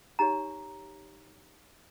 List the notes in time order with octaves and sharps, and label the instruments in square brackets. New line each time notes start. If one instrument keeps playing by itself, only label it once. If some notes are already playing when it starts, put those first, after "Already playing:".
[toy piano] D#4 G4 C#5 A#5